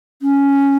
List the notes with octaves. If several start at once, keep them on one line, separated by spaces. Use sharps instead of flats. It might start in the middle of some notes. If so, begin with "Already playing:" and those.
C#4